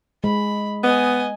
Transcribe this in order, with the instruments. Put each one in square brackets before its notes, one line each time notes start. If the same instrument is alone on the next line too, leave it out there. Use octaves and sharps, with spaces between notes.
[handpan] G#3 [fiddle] B5
[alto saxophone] B3 [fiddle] D#5 G#5